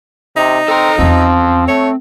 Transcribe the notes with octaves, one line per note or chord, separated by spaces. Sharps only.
C3 D#4
C4 A4 A#5
E2 F3 C4 C#4
A3 C#5